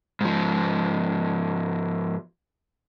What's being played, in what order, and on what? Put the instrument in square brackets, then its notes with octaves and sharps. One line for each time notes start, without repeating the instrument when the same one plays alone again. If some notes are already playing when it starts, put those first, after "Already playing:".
[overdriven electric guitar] G#2 F3